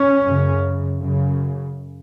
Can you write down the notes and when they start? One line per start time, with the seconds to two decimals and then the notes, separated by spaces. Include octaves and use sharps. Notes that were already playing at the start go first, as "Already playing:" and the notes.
Already playing: C#4
0.21 F#2 C#3
0.97 F#2 C#3